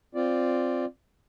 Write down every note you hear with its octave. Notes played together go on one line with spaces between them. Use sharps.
C4 F4 D5